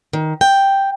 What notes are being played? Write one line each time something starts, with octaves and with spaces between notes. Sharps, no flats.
D#3
G5